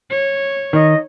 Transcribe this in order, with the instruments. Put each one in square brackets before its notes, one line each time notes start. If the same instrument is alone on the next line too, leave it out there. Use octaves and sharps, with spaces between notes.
[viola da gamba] C#5
[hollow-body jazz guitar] D#3 [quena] D#5